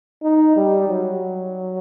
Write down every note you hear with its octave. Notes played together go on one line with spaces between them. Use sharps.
D#4
G3
F#3